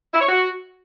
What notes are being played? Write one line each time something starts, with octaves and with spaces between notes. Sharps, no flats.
E4
C#5
F#4